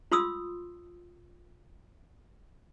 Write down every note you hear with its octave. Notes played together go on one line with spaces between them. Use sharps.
F4 C6 D#6 E6